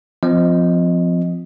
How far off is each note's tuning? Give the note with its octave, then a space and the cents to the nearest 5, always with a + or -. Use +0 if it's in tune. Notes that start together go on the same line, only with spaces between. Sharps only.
F3 +0 C4 -30 D#5 +0